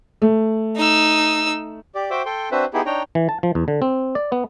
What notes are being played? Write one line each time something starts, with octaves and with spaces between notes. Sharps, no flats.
A3
D#4 E6
G4 D5
F#4 C5 E5 G5 D6
A4 G5 C6
C4 D4 F#4 B4 C5 E5
B3 D#4 E4 G4 G#4
D4 D#4 C#5 G5 A#5
E3
A5
F3
E2
D3
C4
D5
B3